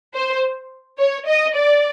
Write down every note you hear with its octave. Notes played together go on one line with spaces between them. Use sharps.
C5
C#5
D#5
D5